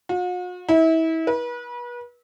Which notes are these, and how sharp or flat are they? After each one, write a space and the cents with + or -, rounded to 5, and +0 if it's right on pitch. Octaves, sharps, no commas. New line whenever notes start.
F#4 -45
E4 -30
B4 -35